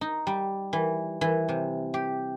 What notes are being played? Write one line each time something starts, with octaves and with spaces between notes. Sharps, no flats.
D#4
G3
E3
E3
C3
G4